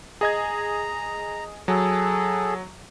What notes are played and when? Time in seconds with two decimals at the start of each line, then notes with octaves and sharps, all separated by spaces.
0.21 G#4 D#5 A#5 G#6
1.68 F#3 G#4 A4